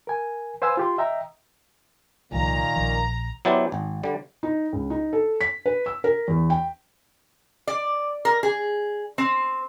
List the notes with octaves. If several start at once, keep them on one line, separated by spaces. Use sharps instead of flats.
A#4 G#5
B4 C5 F5 G#5 E6
F4 G4 C6
D#5 E5 G5 A#5
C2 A#2 D#3 F3 G3 A#3 A#5
A#1 F3
F#3 B3 E4 G4 C5 D5
G#1
D3 G3
D#4
C#2
D#4
A4
B6
B4
E6
A#4
E2
G5
D5
A#4
G#4
C4